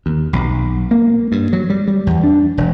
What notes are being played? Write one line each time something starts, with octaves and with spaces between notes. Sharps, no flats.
D#2
B1
A#3
G2
F#3
G3
G3
E2
D4
E1